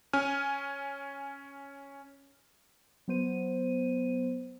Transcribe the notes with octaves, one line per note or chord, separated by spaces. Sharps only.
C#4 G#5 F6
F#3 B3 C5 D#7